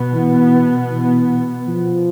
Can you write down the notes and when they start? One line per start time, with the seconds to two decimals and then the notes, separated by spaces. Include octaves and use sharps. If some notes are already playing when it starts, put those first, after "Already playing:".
Already playing: B2 B3
0.14 E3
0.91 E3
1.68 F3